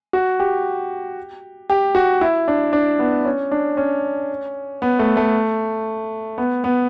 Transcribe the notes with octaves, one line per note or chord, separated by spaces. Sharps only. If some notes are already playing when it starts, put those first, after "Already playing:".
F#4
G4
G4
F#4
E4
D4
D4
B3
C#4
D4
C#4
B3
A3
A3
B3
B3